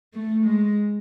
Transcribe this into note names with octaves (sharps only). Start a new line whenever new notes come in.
A3
G#3